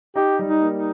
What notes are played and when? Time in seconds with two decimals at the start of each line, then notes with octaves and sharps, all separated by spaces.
0.16 D#4 G4
0.39 G3
0.47 D#4
0.61 A#3
0.77 D#4